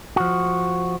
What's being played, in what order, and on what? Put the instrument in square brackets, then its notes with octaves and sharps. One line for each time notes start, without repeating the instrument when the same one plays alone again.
[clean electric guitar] F3 F#4